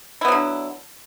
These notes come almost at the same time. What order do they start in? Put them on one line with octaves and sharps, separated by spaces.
E4 B3 F#3 D3